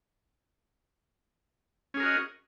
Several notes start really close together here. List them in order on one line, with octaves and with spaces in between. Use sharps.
C#4 G#4 A#4 F#4 D#5